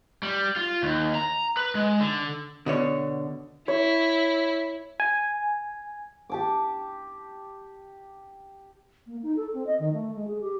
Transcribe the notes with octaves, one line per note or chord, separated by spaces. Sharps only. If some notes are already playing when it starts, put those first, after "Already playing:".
G3
F4
D#2
A#5
B4
G#3
D3
B2 D3 C#5
E4 C#5
G#5
G4 A5 D6
A#3
D#4
A4
C4
D#5
D#3
A3
G#3
G#4
G4